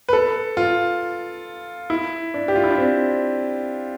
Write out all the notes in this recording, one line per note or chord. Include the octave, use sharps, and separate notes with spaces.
B4
A4
F4
E4
D4
G4
F4
E4
D4
C4